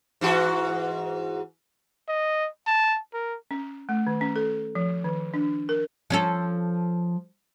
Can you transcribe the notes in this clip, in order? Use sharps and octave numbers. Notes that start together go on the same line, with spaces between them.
G#2 E3 F#4
D#5
A5
A#4
C#4
A3
D#3
C#4
A4
F3
D#3
D4
A#4
F3 C#4 A4